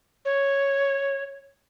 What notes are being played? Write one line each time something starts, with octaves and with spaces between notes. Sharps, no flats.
C#5